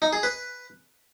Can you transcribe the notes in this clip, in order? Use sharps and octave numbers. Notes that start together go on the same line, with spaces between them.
D#4
G#4
B4